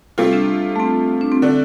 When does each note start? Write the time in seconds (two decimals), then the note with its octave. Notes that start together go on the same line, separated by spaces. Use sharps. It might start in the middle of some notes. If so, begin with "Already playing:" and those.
0.18 C3 G3 A3 F4
0.33 D4
0.76 A3
0.80 C4
1.21 D4
1.32 C4
1.42 D3 A3 D4